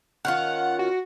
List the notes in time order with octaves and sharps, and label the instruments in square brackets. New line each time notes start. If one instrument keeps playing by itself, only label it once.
[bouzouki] D#3 C#4 F4 [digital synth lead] F#5
[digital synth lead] F#4